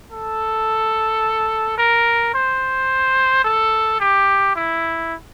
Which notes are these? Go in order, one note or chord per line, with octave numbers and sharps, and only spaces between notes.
A4
A#4
C5
A4
G4
E4